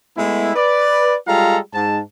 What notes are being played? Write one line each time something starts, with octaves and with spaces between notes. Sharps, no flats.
G#3 A3 B3 E4
B4 D5
G3 G#3 F4 A4 F5 A#5
G#2 A5